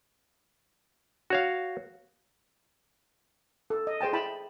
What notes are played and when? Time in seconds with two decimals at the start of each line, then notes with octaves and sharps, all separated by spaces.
1.30 F#4 C#5 F5
3.70 A4
3.87 D#5
4.01 G#4 C5 G5 A5
4.13 E4 G5 A5 B5